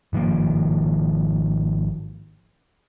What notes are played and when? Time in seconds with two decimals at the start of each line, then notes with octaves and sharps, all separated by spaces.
0.13 G#1 D#3 F3 A#3